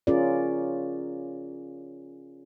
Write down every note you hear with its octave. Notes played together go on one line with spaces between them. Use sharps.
C#4 F4 G#4 A#4 D5